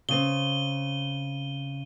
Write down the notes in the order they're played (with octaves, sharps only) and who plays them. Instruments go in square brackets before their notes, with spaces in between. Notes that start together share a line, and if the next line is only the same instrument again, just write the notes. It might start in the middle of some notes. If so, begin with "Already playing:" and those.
[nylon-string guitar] C#3 C4 [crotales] D#7 G7